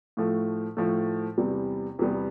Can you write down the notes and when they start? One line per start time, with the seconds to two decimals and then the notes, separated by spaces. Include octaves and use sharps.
0.17 A2 F3 A3
0.77 A2 F3 A3
1.38 E2 C3 G3 B3
1.99 E2 C3 G3 B3